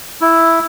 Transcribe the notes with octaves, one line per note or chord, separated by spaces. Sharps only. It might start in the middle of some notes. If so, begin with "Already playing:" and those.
E4